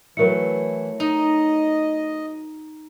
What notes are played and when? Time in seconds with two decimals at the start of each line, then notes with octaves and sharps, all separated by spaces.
0.17 E3 F#3 A3 E4 A#4 C#7
1.00 D#4 D#5